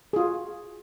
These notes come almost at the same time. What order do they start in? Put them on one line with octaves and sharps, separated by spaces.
G#4 F4 F#4